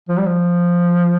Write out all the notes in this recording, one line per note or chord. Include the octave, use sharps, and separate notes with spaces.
F3
G3
F3